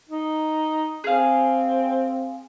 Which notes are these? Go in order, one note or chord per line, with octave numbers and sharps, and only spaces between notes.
D#4
C4 G#4 F5